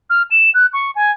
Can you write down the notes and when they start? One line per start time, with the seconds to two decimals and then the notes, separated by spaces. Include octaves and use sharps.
0.10 F6
0.31 E7
0.54 F#6
0.73 C#6
0.95 G#5